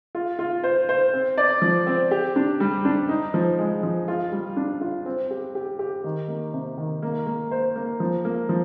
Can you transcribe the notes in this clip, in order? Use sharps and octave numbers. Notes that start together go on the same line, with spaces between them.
F4
F4
C5
C5
C4
D5
F3
C4
G4
D4
G3
D4
D#4
F3
G#3
F3
F4
G3
D4
F4
C4
G4
G4
G4
D#3
A#3
C3
D#3
A#3
A#3
C5
A#3
F3
A#3
F3